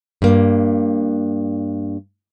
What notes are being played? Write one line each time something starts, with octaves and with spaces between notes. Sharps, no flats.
G2 A#3